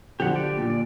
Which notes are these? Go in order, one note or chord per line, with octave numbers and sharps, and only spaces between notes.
D3 F3 G4 F#5
G4 D5
A#2 D3
D5